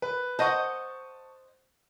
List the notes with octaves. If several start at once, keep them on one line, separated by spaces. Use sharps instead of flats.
B4
C5 D#5 F#5 A5 C#6